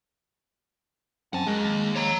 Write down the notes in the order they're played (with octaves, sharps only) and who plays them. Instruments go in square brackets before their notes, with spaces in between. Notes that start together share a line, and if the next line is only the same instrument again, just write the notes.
[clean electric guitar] F#2 C4 [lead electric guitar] F#5 A5
[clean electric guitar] G#3 [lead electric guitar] F#4 A#4
[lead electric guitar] D#2
[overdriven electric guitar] C#5 A#5